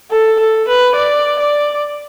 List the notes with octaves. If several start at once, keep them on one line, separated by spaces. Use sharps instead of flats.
A4
A4
B4
D5
D5